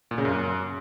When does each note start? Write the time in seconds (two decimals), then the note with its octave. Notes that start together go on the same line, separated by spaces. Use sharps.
0.11 A#2
0.18 C#3
0.25 F#2